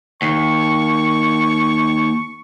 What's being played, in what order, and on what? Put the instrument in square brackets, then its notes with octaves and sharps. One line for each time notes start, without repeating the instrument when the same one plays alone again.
[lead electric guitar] D#2 [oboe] C#6